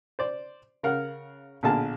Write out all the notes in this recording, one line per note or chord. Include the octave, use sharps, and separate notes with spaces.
C5 D5
C#3 A#4 F5 F#5
A#1 B2 D3 A#3 G#4 A5